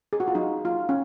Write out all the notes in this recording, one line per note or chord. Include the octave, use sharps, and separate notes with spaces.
G#4
F#4
F4
F#3 D#4
F#3 F4
C#4